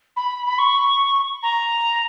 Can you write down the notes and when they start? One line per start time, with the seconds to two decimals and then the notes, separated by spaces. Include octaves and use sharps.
0.17 B5
0.46 B5
0.59 C#6
1.43 A#5